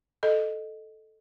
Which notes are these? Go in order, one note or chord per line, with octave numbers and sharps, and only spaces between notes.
A4 D#5